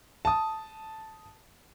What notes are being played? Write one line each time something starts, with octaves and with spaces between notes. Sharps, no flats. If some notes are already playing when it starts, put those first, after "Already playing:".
A5 D#6